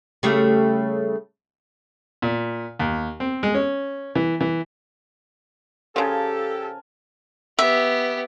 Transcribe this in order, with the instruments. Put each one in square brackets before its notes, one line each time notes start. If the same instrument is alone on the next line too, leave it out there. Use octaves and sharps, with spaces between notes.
[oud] C#3 G3 A3
[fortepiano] A#2
D#2
C4
G#3
C#4
E3
E3
[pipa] C#3 F3 [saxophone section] G4 A4 [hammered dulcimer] A#4 G#5 A5
[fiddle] B3 G4 [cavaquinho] E5